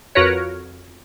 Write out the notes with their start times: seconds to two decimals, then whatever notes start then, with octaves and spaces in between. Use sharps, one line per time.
0.15 F2 F#4 A#4 B4 C#5